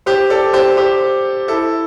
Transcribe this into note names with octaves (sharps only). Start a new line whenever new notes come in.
G4 C5
A4 D5
G4 C5
G4 C5
E4 A4